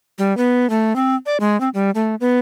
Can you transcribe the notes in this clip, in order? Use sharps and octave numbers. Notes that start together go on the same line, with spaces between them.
G3
B3
A3
C4
D5
G#3
C4
G3
A3
B3